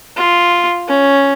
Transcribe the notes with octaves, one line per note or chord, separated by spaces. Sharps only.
F4
C#4